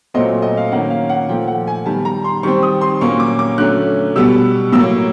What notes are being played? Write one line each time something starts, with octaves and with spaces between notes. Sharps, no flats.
A#2 F#3 A3 C4 D#5
D#5
F5
D#3 F#3 A#3 C#4 F#5
F5
F#5
A#2 F3 A3 G5
F#5
G#5
D#3 G3 B3 A5
A#5
C6
D#3 G3 C4 C#6
D#6
C6
A#2 F#3 A#3 C#4 C#6
D6
D6
D3 F#3 A3 C#4 F#6
B2 G3 B3 E6
A2 F#3 A#3 E6